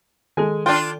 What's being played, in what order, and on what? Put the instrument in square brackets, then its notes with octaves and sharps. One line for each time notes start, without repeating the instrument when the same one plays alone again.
[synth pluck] D#3 A4 [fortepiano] G#3 G#5
[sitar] D4 F4 [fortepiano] G5